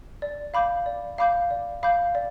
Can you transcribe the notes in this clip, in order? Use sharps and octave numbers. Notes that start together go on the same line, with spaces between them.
D5
F5 B5 D6 G6
D5
F5 B5 D6 G6
D5
F5 B5 D6 G6
D5